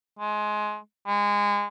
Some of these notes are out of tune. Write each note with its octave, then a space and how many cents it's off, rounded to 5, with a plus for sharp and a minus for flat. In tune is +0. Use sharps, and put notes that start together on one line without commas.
G#3 +20
G#3 -25